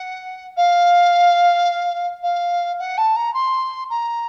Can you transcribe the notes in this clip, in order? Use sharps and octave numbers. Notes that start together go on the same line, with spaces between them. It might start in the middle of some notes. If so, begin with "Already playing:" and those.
Already playing: F#5
F5
F5
F#5
A5
A#5
C6
A#5